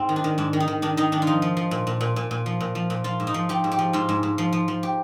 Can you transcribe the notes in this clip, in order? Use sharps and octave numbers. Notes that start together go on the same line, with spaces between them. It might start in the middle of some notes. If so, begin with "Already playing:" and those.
Already playing: G#2 C4
D#3
D4
D#3
G#2 D4
D#3
D#4
D#3
D#3 D4
D#3 D#4
D#3 D4
F4
F3 D#4
F3
F3
A#2
A#2
A#2
A#2
A#2
F3
A#2
F3
A#2
F3 F4
G#2
D#4
F3
F3 G4
G#2
G4
F3
G#2 F4
G#2
G#2
F3
F3
F3
G4